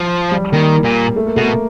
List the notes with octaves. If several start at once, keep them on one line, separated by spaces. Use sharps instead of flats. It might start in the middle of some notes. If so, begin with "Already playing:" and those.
Already playing: F3
G3
D#3 A#3
A#2
A3
A#3
B2 A3
A#3